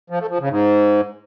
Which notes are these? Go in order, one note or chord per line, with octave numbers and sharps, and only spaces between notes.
F3
A3
F3
C#3
G#2